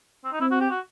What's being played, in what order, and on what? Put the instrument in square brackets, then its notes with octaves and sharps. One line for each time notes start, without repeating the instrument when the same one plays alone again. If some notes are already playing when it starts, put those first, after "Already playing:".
[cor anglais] C4
D#4
[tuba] C4 [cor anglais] E4
[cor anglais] F#4
G4
F#4